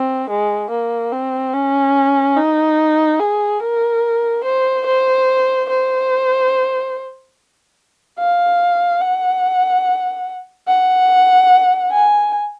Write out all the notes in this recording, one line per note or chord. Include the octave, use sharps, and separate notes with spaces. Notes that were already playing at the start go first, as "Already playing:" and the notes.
Already playing: C4
G#3
A#3
C4
C#4
D#4
G#4
A#4
C5
C5
C5
F5
F#5
F#5
G#5